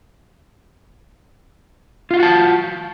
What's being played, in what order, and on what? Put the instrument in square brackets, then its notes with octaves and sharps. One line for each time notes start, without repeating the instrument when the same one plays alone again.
[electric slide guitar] F4
F5
F#4
F#5
A5